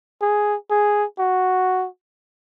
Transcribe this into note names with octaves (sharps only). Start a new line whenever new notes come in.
G#4
G#4
F#4